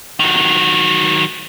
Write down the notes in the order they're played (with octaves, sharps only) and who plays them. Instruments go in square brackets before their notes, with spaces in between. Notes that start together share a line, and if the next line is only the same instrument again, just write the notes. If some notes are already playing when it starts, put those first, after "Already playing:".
[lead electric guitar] D#3 F#3